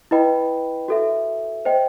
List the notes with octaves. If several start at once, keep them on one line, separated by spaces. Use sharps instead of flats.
E4 B4 D#5 G5 B5
F#4 A4 E5
C5 D#5 G5